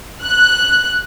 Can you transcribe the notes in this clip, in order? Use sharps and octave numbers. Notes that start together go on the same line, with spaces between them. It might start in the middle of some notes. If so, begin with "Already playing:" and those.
F#6